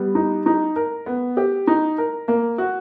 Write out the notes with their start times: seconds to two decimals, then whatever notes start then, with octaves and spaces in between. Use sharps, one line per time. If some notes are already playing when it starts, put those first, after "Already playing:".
Already playing: G3 B3
0.15 D#4
0.46 D#4
0.76 A#4
1.06 B3
1.37 G4
1.67 D#4
1.98 A#4
2.28 A#3
2.58 F#4